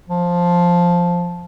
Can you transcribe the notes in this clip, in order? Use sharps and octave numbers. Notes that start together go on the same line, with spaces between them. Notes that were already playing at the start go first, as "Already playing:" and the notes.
F3